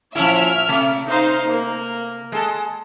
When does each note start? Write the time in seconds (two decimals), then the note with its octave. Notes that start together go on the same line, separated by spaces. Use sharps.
0.15 A#2 F3 C#4 E4 E5 F6
0.69 C3 A3
1.07 D#4 C5 F5
1.49 A#3
2.32 G#3 A4